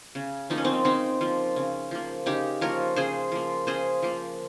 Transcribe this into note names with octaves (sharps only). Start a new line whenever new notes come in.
C#3
F3 A#3 D#4
C#4
C4 D#4
C#3 C4 D#4
F3 A#3
C#3
F3 A#3
C#3 D#4 G4
F3 A#3 A#4 C#5
C#3 G#4 C5
F3 A#3
C#3 G#4 C5
F3 A#3